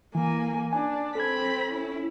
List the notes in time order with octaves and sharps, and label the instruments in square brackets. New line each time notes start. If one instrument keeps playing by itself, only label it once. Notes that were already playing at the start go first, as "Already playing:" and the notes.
[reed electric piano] E3 [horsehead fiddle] A#3 G#5
[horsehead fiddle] D4 [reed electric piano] G#5
[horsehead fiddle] C4 B5 [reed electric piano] A4 G#6
[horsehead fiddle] C#4 E4